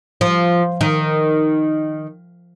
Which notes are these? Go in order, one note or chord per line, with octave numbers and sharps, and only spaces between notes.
F3
D#3